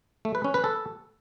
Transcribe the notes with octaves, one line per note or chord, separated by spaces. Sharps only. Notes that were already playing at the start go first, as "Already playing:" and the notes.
A3
B4
C#4
B4
A4